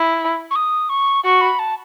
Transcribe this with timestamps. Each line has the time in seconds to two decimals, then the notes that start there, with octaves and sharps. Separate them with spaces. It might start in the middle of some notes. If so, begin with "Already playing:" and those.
Already playing: E4
0.51 C#6
0.55 D#6
0.89 C#6
1.24 F#4 C#6
1.41 B5
1.59 A5